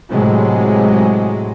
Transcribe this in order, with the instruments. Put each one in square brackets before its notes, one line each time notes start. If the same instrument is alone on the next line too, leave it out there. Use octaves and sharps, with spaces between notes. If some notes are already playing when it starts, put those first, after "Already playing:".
[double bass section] A2 C3 F#3 G#3